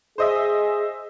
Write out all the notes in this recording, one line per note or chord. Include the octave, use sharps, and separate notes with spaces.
G#4 C5 D#5 E5